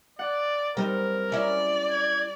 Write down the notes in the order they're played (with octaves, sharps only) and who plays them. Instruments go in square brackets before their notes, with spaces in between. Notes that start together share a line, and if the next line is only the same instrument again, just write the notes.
[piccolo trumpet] D5 [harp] F#5
[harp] G3 [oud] C4 D#4 [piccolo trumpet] A#4
[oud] C#4 E4 [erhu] D5
[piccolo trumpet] G#6